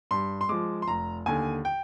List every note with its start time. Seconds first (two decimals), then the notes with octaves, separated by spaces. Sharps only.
0.11 G2 C6
0.41 C6
0.49 F3 G#3 D6
0.82 C6
0.88 F1 A#5
1.26 D#2 D3 G#5
1.65 G5